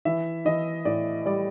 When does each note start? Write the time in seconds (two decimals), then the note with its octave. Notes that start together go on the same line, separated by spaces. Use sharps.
0.05 E3 E5
0.45 E3 D#5
0.85 A2 D5
1.26 G3 D5